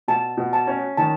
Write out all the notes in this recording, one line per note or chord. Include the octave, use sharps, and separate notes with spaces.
B2 A5
B2
A5
C#4
D#3 A5